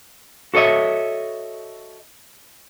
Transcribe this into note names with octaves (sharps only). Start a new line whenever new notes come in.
F#4 A4 C#5 D#5 E5